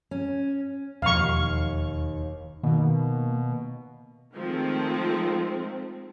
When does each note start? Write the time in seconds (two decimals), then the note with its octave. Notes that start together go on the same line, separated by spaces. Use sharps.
0.11 C#4
1.02 E1 D#2 F3 F5 C#6
2.63 B2 D#3 A#3
4.35 D#3 F3 G#3 A3 C4